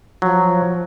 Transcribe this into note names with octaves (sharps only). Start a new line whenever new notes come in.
F3 F#3